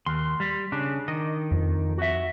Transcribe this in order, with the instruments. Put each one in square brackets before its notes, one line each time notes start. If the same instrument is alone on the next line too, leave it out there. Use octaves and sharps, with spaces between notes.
[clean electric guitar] D#2 [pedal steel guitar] C6
[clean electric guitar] G3
[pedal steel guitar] C#3 [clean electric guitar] D4
[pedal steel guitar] D#3 [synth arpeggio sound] D#5
[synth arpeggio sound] F2
[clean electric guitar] F#4 E5